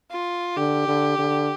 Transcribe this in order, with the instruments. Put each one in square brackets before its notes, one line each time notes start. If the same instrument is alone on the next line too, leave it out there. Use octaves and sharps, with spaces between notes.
[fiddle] F4
[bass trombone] D3 [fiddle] G4
[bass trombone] D3
D3